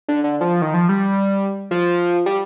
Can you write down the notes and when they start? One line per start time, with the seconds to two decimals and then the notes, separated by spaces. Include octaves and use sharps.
0.08 D3
0.24 D3
0.41 F3
0.62 D#3
0.74 F3
0.89 G3
1.71 F3
2.26 G3